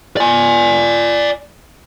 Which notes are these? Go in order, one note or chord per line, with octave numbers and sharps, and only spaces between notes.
D5 G#5